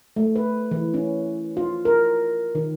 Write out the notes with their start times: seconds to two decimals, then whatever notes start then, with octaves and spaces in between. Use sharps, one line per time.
0.16 A3
0.36 B4
0.71 E3
0.94 C#4
1.57 F4
1.85 A#4
2.55 D#3